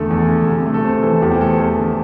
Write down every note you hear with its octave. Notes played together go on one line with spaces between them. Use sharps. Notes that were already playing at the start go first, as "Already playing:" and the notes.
Already playing: E2 D3 A3 A4
E2
D3
C3
A3
A4
C3 C5
E3 A4
E2 G4
C5
A3 A4
E2 A4
D3